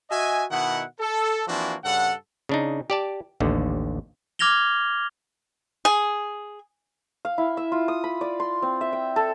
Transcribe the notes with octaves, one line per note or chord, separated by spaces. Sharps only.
F#4 D#5 E5 G#5
B2 D#3 E4 F#5
A4
E3 F3 A#3 C4 D4 F#4
G2 C#3 A4 F#5
C#3 D4 D#4
G4 D5 A5
A1 D#2 D3
D6 F6 G#6 A#6 F7 G7
G#4
F5
E4
E5
F4
D#6
B5
D5
C6
C4
E5
G5
A4